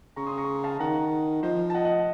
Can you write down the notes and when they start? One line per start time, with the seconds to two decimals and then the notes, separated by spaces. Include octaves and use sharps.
0.16 C#3 A#5 C#6
0.26 C6 D#6
0.38 A#5 C#6
0.64 F5 A5
0.79 D#3 F#5 A#5
1.43 F3 C5 D#5
1.70 A5
1.74 D#5 F#5
1.85 D#5 F#5